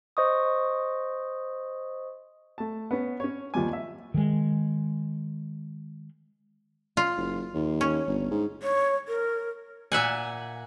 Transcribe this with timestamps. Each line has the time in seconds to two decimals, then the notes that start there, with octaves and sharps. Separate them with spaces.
0.17 C5 D#5 C#6 D#6
2.58 A3 A5
2.91 B3 C#4
3.20 C#4 C#5
3.54 D#2 F3 G3 G#5
3.73 E5
4.14 D#3 G#3
6.97 F4
7.17 F#1
7.54 D#2
7.81 C#4
8.06 G1
8.31 G#2
8.62 C#5
9.08 A#4
9.92 A#2 E5 F#5 G#5